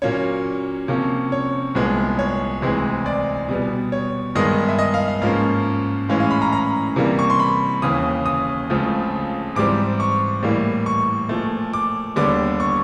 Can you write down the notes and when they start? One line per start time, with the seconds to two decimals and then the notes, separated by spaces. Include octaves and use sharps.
0.02 A#2 F#3 A#3 C#4 C#5
0.88 C3 F3 A#3 C#4
1.32 C#5
1.75 C2 A#2 F3 G#3 B3
2.19 C#5
2.62 D2 C3 E3 G#3 C4
3.06 D5
3.49 B2 G3 B3
3.92 C#5
4.35 G2 D#3 G#3 B3 D#5
4.69 E5
4.79 D#5
4.94 F5
5.08 F5
5.22 G#2 F3 A#3 C#4 F5
6.09 A2 E3 G#3 C#4 F5
6.20 F5
6.31 B5
6.42 A#5
6.52 A#5
6.96 C3 E3 G3 A#3
7.19 C#6
7.30 C6
7.39 B5
7.82 D#2 C#3 E3 D#6
8.26 D#6
8.69 C#2 C#3 F3 A3 C4
9.56 G#2 E3 G3 C4 D6
10.00 C#6
10.43 A2 E3 G3 A#3
10.86 C#6
11.29 A#2 F3 A3
11.73 D6
12.16 D#2 D3 G3 B3 D6
12.60 C#6